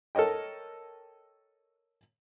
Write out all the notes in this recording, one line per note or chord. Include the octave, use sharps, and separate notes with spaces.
A4 A#4 C#5 D#5 G5